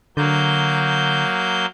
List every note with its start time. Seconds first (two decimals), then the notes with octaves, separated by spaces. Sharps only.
0.17 D3 F#3 A#3 G6